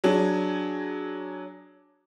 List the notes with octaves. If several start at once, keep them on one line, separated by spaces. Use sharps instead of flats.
F#3 D4 G#4